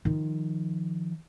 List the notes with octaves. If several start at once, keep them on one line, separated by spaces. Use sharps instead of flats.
D#3 F3